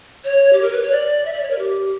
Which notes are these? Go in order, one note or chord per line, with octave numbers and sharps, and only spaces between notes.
C#5
G4
A#4
B4
C#5
D5
E5
D5
C#5
A#4
G4